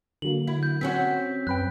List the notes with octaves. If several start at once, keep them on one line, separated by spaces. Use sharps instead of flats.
D3 F#3 A#3 F#7
E4
G6
C4 C#4 F#4 B6
F#2 B4 G5 F#6